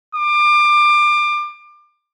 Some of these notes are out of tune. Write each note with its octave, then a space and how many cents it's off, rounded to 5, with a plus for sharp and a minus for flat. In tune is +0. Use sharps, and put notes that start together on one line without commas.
D6 +30